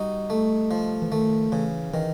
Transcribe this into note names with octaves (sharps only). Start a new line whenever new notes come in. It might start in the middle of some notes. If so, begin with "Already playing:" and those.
Already playing: G3 D#4 F#4
A3
F3
E3
D#3 A3
C#3 E3
D#3 E3